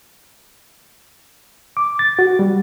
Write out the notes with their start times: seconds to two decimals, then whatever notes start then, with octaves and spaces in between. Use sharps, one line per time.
1.77 D6
1.99 A6
2.19 F#4
2.39 G3